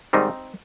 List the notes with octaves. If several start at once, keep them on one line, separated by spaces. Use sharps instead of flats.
G#2 D#3 G3 C4 D#4